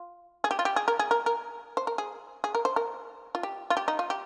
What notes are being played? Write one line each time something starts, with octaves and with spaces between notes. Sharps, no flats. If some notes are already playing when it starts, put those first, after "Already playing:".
Already playing: F4
G#4
G4
F4
G4
G#4
A#4
G#4
A#4
A#4
C5
A#4
G#4
G#4
A#4
C5
A#4
F4
G4
F4
G4
D#4
F4
G4